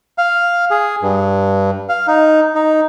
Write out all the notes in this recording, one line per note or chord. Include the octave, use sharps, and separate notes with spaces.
F5
G#4
G2
F5
D#4
D#4